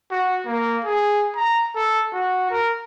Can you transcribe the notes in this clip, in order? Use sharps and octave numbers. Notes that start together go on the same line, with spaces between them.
F#4
A#3
G#4
A#5
A4
F#4
A#4